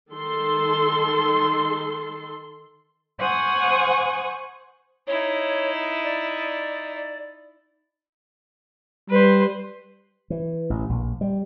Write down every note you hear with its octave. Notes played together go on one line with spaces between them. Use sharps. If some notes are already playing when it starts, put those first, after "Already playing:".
D#3 A4 C6
C5 F#5 G#5 C#6 D#6
D#4 E4 C#5
D5
G3 B4 C5
E3
A1
A#1
G3